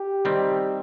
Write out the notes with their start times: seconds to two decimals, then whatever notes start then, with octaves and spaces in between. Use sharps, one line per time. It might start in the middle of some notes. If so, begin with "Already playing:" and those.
Already playing: G4
0.25 D#3 G3 C4